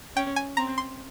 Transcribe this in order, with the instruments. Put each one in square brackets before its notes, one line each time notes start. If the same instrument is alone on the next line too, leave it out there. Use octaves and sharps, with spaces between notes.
[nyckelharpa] C#4 [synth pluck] G5
[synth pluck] G#5
[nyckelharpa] C4 [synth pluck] A#5
[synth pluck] C6